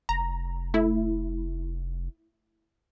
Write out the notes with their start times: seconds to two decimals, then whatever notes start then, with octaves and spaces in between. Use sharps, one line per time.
0.09 F1 A#5
0.74 A3 E4